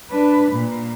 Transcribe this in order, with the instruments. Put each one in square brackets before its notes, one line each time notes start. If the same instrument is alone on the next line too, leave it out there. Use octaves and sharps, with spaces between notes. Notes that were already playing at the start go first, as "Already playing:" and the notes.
[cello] D4 B4
A#2